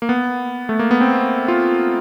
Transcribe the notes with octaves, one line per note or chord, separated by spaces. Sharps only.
A#3
B3
A3
A#3
B3
C4
F4